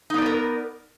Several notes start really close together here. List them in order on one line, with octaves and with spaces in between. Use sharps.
D#4 B3 D5 B4 A#4